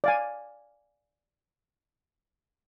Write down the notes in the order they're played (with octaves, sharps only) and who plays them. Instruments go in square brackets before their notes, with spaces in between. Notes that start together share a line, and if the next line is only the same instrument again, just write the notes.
[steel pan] D5 F5 G#5